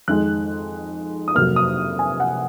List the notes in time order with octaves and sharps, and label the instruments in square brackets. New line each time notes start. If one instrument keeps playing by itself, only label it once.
[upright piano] F2 D#3 G#3 F#6
D#6
F2 C3 F#3 A#3 F6
D#6
G#5
F#5